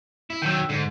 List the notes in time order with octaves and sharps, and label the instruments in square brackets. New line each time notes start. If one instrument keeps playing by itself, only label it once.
[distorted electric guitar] E4
[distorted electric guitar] D#3 F#3 [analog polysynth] G5 E6
[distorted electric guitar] G#2 [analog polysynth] D3